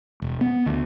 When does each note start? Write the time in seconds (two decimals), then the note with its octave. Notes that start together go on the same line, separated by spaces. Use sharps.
0.22 E1
0.41 B3
0.66 D2